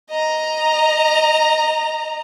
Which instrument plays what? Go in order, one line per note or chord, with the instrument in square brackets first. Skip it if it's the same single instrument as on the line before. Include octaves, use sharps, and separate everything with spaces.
[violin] D#5 A#5